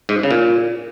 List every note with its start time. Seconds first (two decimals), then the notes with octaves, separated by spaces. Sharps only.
0.09 G#2
0.23 C#3
0.31 A#2